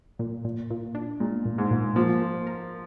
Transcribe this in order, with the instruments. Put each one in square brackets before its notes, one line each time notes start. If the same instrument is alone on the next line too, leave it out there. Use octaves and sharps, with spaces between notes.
[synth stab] A#2
A#2
A#2
D4
[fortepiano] A#2 [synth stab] G#3
[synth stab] A#2
[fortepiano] G#2
[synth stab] A#2
[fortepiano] F3 [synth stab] A#3
[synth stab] A#3
A#4